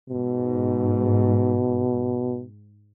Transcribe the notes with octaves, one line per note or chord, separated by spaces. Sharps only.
G#2 B2